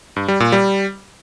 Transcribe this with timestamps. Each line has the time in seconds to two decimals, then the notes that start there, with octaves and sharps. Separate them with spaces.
0.16 G2
0.28 G3
0.40 A#2
0.52 G3